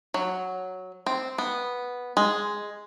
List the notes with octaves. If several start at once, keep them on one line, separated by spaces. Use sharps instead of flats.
F#3
C4
B3
G#3